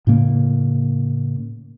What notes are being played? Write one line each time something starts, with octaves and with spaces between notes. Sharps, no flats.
A2 C#3 A#3